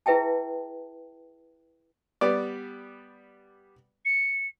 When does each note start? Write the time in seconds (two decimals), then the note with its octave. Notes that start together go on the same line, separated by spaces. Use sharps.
0.06 E4 G#4 B4 E5 G5 A5
2.21 G3 B3 D5
4.05 C#7